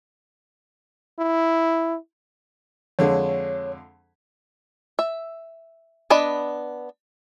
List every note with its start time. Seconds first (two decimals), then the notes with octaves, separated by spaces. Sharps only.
1.19 E4
2.99 F2 D3 G#3 C#5
4.99 E5
6.10 B3 D4 D#5 B5